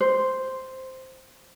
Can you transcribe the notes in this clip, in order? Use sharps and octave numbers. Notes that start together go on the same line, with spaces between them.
C5